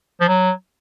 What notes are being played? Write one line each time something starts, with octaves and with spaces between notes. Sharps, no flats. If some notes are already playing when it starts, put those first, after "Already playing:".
F3
F#3